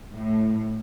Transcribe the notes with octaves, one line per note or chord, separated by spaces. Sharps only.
A2